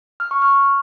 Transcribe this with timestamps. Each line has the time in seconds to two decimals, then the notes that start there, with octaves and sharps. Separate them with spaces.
0.20 F6
0.31 C#6
0.42 F6